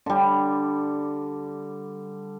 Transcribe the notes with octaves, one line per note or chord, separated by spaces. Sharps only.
D3 G3